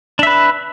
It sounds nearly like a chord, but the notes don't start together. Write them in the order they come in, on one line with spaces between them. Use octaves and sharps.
D4 E5 B4